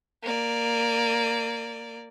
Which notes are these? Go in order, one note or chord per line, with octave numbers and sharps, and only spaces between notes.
A#3 D5